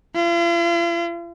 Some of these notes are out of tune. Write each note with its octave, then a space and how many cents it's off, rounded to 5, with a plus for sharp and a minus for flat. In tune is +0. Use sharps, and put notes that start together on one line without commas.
F4 -45